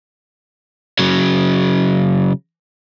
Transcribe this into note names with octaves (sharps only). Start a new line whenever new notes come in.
C#3 F#3